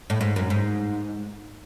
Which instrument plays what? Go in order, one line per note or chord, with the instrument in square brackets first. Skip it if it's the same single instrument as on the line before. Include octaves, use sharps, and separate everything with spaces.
[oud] A2
G#2
F#2
G#2